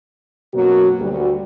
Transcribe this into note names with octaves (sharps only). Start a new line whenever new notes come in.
F#2 B2 F#3 A#3 F#4
D2 G3 F#4